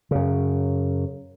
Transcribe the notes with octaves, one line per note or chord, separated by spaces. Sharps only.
F#2 C#3